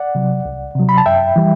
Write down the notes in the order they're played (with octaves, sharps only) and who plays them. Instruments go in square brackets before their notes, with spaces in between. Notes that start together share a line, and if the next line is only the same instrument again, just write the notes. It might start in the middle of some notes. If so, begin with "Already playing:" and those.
Already playing: [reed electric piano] D5 F#5
C3 F#3
C2
C3 F#3
B5
A5
F#2 E5 G5
E3 G3